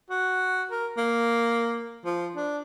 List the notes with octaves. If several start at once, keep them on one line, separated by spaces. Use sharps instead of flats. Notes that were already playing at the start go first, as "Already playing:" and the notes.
F#4
A#4
A#3
F3
D4